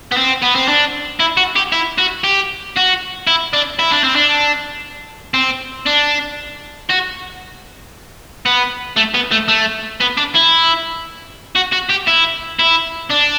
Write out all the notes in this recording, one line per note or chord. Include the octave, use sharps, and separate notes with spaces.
B3
C4
B3
C4
D4
E4
F#4
G4
E4
F#4
G4
F#4
E4
D4
E4
D4
C4
D4
C4
D4
F#4
B3
A3
B3
A3
A3
B3
D4
E4
F#4
F#4
G4
E4
E4
D4